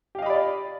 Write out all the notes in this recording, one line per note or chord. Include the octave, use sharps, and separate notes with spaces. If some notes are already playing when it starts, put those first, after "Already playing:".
G4 D5 D#5 F5 B5